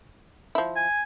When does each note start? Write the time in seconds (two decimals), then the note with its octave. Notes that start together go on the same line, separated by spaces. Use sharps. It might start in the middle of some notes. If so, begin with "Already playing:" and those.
0.55 F3 E4
0.76 G#5